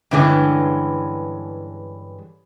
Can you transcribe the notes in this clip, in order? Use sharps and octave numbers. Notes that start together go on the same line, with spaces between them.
G2 D3 E3 G#3 C#4